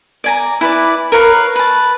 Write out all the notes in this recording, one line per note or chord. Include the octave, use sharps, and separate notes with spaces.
D5 G#5 A#5
E4 B4 D5
A#4 B4 C#5 F5
B4 A5